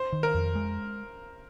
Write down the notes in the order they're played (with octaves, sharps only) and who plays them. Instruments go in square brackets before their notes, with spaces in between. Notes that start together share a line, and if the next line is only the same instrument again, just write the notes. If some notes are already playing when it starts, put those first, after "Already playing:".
Already playing: [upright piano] C5
[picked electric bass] D#3
[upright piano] A#4
[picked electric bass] F2
G#3